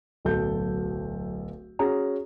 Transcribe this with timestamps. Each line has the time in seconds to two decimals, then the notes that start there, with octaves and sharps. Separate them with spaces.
0.25 D1 B1 A4 G6
1.79 C#4 F#4 G#4 A#5